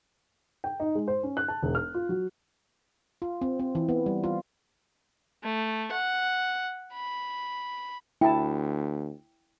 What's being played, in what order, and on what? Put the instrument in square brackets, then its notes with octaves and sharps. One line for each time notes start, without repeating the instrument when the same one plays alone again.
[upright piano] G5
D#4
G#3
C5
C#4
F#6
A5
E1
F6
F4
F#3
[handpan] F4
C4
C4
E3
B3
G3
F4
[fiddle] A3
F#5
B5
[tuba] D2 [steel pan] E4 A5 [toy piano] G5